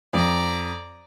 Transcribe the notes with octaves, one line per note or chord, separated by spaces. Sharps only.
F2 D5 A#5